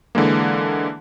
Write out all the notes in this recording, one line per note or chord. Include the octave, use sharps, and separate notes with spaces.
D3 E3 G#3 A#3